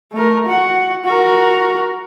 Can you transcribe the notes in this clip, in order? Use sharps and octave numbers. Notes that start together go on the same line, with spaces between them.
A3 A#4
F#4 F#5
F#4 A#4